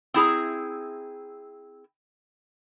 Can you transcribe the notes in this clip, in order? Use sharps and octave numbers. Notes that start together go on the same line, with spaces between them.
C4 E4 G#4 A#5